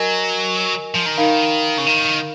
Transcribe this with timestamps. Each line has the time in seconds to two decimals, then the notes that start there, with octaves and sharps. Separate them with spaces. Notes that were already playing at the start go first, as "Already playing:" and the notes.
Already playing: F#3 A#4 D#5 G#5
0.94 F3
1.06 D#3
1.17 D#4 A#4 F5 B5
1.78 C#3
1.86 D#3